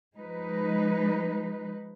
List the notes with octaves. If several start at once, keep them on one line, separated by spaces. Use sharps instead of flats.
F3 G#3 D#4 B4